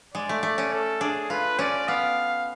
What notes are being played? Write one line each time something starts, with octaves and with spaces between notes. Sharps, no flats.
G#3 D5
A3
A3
C#4
A4
D4 G#4
F4 B4
C#4 D5
B3 F5